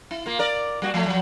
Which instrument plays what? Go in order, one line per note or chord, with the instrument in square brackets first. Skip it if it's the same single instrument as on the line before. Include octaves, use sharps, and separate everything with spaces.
[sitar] E4
A#3 F4
A#4 D5
G3 A#3 F#4
F3 A3
F3 F#3